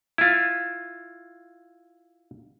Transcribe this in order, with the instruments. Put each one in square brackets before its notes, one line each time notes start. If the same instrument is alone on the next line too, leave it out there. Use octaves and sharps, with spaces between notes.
[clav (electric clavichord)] E4 F4